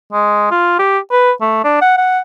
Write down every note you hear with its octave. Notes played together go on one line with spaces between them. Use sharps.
G#3
F4
G4
B4
A3
D4
F#5
F#5